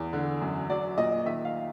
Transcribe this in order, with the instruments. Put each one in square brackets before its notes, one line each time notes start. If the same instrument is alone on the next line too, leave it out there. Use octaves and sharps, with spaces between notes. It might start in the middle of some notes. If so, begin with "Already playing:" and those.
Already playing: [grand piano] E2
D3
F#2
F#3 D5
A#2 D#5
D#3 E5
F5